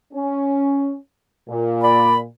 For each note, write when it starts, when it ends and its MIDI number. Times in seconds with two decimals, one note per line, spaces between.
0.13 0.96 61
1.48 2.26 46
1.82 2.17 74
1.82 2.17 83